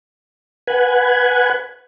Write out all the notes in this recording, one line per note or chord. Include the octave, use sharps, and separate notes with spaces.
B4 F#5 G#5